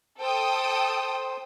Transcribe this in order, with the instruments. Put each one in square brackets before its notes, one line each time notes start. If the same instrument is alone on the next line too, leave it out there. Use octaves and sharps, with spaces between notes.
[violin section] A4 G5 D#6 [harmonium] C5